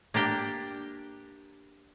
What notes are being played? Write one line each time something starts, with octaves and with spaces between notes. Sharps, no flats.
A#3 D4 G4 G5